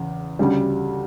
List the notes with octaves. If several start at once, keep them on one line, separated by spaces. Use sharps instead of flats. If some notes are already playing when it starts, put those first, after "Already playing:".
Already playing: E2 C#3
D2 C#3 G3